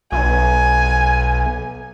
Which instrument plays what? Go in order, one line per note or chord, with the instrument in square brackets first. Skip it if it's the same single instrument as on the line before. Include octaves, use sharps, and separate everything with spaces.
[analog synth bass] B1 [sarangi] G#5